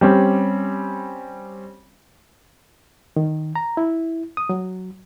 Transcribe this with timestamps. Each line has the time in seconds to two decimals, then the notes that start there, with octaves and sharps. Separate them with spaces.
0.01 G3 C4 C#4
3.16 D#3
3.56 A#5
3.77 E4
4.37 D#6
4.49 F#3